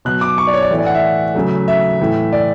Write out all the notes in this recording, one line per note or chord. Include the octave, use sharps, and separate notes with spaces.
B2 F#3 B3 F#6
D6
C#6
D5
C#5
D5
A2 E3 A3
D5
F#5
E5
C#3 F#3 A3
E5
A2 E3 A3
D5